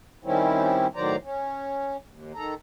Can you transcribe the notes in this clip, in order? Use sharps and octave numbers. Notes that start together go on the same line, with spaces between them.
D#3 G3 C4 C#4 E4
A2 D#3 F#3 C5 D5 A#5
C#4
D#2
D#3 A4 A#5